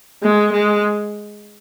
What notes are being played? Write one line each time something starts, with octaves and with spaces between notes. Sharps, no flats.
G#3
G#3